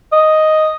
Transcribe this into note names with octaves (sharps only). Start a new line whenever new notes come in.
D#5